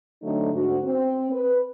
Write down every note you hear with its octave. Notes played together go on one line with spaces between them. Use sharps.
D3 F#3 A3 C4 D4 D#4
D2 G#2 D4 F#4
C4
B4